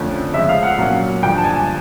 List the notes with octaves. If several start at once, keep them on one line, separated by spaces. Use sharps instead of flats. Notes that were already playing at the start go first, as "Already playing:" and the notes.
Already playing: F2 D3 F3 A3 C#4
C#3 F3 G#3 E5
F5
F#5
A#2 F#3 A#3 C#4
G2 D3 F3 G5
A5
G#5